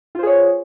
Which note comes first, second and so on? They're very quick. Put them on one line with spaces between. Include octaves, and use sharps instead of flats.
F4 C5 G#4 C#5